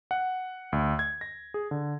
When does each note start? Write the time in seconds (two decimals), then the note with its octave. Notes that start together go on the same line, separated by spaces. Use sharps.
0.11 F#5
0.72 D2
0.99 G#6
1.21 A#6
1.54 G#4
1.71 D3